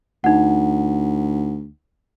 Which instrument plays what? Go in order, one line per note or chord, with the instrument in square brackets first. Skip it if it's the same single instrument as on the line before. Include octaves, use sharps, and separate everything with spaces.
[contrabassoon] D2 [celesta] D#4 F#5